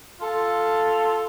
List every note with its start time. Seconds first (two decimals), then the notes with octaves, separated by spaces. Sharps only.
0.21 F4 A4